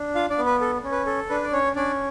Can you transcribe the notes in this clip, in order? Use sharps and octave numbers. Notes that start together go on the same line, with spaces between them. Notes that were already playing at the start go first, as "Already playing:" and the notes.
Already playing: D4
F4 F5
D4 D5
B3
B4
A4
C#4
B4
A4
D4 B4
D5
C#4 C#5
C#4 D4 D5